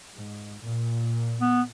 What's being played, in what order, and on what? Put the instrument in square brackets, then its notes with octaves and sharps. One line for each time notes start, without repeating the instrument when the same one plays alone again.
[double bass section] G#2
A#2
[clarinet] B3